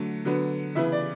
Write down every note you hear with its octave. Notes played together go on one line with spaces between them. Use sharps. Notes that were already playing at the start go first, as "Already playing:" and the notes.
Already playing: D3 F#3 A3
D3 F#3 B3
C#3 E3 B3 E5
D5